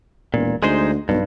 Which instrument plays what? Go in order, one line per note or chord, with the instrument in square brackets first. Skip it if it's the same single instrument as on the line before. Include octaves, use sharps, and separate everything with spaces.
[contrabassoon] E1 [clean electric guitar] A#2
[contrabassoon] D2 [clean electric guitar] G#3 D#4 C5
[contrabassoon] B1 [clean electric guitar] G2